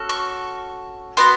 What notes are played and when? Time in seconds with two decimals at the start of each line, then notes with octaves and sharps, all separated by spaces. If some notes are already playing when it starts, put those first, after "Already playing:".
Already playing: C#4 F#4 A4
0.09 C#6
1.17 B3 D4 F#4 C6